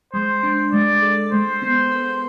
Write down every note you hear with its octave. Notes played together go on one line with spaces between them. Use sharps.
G#3 C5
D4
G#3 D5
A4
G#3 C5
B3
B4